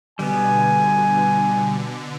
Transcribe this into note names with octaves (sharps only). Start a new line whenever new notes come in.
B2 D3 G3 B3 G#5